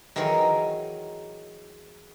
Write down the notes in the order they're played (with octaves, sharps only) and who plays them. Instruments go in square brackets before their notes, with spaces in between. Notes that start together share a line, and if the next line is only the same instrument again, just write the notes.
[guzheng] D#3 E3 F#3 G#4 A#4 C#5